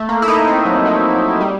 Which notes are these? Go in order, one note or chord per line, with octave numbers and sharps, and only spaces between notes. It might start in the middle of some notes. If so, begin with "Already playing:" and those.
Already playing: A3
A#3
E4
D#4
C4
F#3
F3
F#3
G3